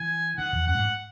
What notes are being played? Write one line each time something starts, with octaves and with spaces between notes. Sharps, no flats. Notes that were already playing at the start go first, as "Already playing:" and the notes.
Already playing: E3 G#5
D#3 F#5
E2
F#2 F#5
G#2